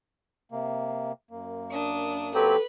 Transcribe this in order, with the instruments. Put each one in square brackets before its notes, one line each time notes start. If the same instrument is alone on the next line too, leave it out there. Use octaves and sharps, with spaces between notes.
[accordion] C3 A#3
F#2 A#3
[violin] D4 D#6
[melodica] F#3 C4 G4 [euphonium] A4 [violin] B4